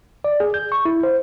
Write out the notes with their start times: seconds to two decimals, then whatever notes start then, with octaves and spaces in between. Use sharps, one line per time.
0.24 D5
0.40 G#4
0.54 G6
0.72 C#6
0.85 E4
1.03 C5